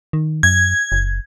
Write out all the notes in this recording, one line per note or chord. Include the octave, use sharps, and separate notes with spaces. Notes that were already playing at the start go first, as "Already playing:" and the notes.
D#3
F#2 G#6
F#1